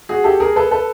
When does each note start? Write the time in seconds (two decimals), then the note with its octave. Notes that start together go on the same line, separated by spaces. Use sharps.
0.09 F#4 G#4
0.24 G4 A4
0.40 G#4 A#4
0.56 A4 B4
0.71 A4 B4